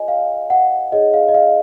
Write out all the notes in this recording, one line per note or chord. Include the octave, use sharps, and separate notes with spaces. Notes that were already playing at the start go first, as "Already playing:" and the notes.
Already playing: F4 G#4 C#5 D#5 G#5
F5
F#5
D#4 G#4 C#5 D#5
F5
D#5
F5